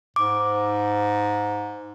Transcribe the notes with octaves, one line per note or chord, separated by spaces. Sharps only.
G#2 D6